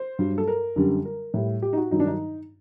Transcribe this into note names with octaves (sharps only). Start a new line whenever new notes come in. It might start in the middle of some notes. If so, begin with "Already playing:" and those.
Already playing: C5
G2 F#3
A4
A#4
F#2 D3 G3
A#4
A2 G3
G4
D#4
F#4
G2 D#3 F#3 D#4
D4
D#4